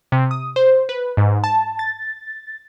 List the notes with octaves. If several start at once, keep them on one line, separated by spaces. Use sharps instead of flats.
C3
D#6
C5
B4
G#2
A5
A6